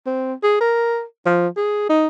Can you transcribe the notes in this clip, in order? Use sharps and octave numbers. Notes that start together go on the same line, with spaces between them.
C4
G#4
A#4
F3
G#4
D#4